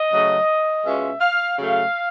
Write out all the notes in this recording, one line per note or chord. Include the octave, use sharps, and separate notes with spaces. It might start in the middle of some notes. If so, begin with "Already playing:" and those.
Already playing: D#5
C#3 F#3 A3
B2 G#3 C#4 F4 E5
F5
C#3 F#3 A3 F5